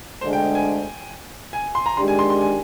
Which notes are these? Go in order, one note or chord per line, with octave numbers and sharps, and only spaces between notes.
D2 D3 G#3 D4 C5
G5
G#5
G#5
C6
A#5
D#3 G#3 D4 G4 C6
G#5
C6
C6
G#5